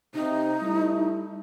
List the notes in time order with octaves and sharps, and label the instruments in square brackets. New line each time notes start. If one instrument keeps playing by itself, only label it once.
[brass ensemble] C3 [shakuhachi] D#4
[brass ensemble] G3 A3 E4